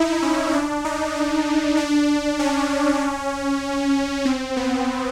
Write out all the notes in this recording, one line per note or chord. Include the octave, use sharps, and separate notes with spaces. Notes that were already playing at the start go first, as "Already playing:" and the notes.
Already playing: D#4 E4
C#4
D4
D#4
D#4
D4
C#4
C4
B3